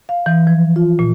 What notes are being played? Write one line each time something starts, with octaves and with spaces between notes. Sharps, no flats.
F5
E3
F3
F4
A#2